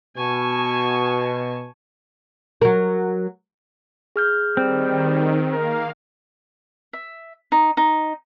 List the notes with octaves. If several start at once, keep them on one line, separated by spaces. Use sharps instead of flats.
B2 G#5 A5 C#6
F#3 A#4
G#4 F6 G6
D#3 G3 C4
A#3 A#4 F5
E5
D#4
D#4